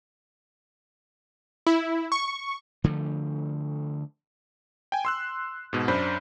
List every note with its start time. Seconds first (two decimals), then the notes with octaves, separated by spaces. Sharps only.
1.67 E4
2.12 C#6
2.84 D3 F3 A3
4.92 G5 G#5
5.05 C6 E6 F#6
5.73 G#2 B2
5.88 F#2 D4 C5 B5